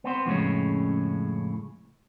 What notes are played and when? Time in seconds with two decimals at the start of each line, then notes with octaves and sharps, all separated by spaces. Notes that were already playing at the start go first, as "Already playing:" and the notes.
0.04 B3 C4 C5
0.26 F2 A2 C#3 G#3 C#4